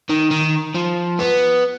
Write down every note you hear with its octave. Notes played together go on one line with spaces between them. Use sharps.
D#3
D#3
F3
B3